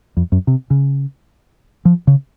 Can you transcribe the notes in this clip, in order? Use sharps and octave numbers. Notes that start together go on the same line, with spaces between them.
F2
F#2
C3
C#3
F3
C#3